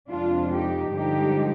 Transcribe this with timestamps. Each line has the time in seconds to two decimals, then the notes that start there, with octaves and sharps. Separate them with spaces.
0.11 F2 C3 F3 G#3 D4 F4
0.54 D#4 G4
0.96 G2 D3 F3 G#3 D#4 G4